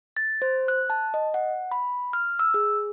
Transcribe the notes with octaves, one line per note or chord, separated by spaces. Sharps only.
A6
C5
F#6
A5
D#5
F#5
B5
F6
E6
G#4